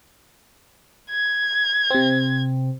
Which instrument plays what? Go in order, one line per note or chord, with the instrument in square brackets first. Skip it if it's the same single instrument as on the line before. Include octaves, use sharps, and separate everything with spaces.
[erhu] G#6
[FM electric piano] C3 C4